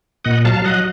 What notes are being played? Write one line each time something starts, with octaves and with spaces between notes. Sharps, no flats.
A#2 D#5 F#5
F#3 F5 A5
F5
F#3 D#5 F#5